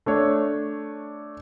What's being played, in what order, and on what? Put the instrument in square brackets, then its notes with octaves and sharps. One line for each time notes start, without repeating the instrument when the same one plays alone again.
[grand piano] A3 D4 C#5